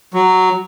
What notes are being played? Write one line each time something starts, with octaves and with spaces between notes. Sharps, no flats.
F#3